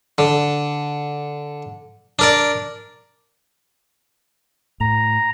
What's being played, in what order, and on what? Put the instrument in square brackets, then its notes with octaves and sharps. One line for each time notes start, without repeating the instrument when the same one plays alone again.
[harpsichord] D3
D4 A#4 D5
[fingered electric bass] A2 [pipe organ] A#5